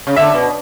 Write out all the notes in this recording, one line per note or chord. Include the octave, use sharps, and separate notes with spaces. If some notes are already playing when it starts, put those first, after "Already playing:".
C#3
D3 E5
B2